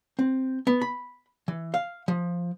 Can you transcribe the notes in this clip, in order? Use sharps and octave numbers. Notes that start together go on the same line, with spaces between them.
C4
B3
B5
E3
F5
F3